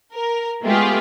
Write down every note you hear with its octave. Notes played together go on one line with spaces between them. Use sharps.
A#4
G#3 A3 B3 F4 G4 G#4